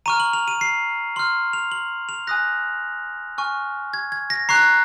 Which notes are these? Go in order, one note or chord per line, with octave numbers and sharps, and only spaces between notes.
A#5 C#6 F6 D#7
F#7
F7
D#7
C7
C6 F6 F#7
F7
F#7
F7
G#5 D#6 F#6 A#6
G#5 C#6 F6
G#6
G#6
A#6
A#5 C#6 F#6 C7